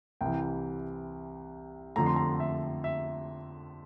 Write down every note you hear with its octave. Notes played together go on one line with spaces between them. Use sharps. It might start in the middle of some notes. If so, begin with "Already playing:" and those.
C2 C3 E3 G5
F2 D3 F3 A3 A#5
C6
A#5
E5
E5